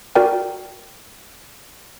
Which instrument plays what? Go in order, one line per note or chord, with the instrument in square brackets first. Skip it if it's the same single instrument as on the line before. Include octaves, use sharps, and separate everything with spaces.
[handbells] F#4 A#4 D5 G5